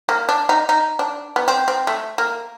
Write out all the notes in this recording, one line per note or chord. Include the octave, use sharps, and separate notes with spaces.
A#3
D4
D#4
D#4
D4
B3
C4
C4
A3
A#3